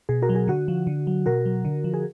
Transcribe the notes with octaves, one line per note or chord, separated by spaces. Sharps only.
B2 G#4
F#4 A#4
F#3
G#4
D3 F#4
F3
D3
F#3
B2 F#4 A#4
F#3
D3
F3
G#4